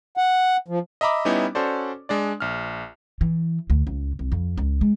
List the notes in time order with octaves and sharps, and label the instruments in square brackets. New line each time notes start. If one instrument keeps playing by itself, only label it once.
[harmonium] F#5
F3
[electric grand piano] D#5 E5 A#5 B5 D6
G3 B3 C#4 D#4 E4
C#4 F#4 A4 C5 D5
G#3 D4 D5
A#1 F6
[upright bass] E3
D2
C#2
C2
F2
C#2
G#3